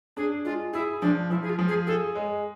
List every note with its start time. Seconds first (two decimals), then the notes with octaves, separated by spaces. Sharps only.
0.17 D4 G#4
0.45 G#3 F4
0.73 E4 G#4
1.02 F3 D4
1.30 F3 E4
1.42 G#4
1.50 F4
1.59 F3
1.68 G#4
1.87 G#4 A4
2.15 G#3